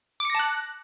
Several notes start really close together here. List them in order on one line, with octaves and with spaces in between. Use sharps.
D6 C#7 A#6 A5 F#6